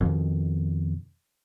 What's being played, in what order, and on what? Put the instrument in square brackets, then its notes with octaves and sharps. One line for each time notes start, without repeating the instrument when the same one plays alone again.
[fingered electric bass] F2 B2 D#3